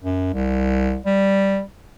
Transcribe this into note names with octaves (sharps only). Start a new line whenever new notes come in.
F#2
C2
G3